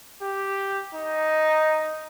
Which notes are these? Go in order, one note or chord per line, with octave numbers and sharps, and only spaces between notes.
G4
D#4